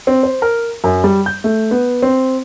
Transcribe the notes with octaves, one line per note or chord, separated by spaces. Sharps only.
C4
C5
A#4
F#2
G3
G6
A3
B3
C4